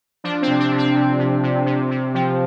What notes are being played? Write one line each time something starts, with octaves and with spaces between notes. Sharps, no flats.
F3 D4
C4
C3
D4
C3
C4
C3
C3
C3
C3
C3
F3